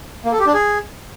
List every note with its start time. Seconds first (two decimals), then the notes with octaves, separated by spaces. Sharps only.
0.25 A#3
0.32 A4
0.39 G4
0.47 D4
0.54 G#4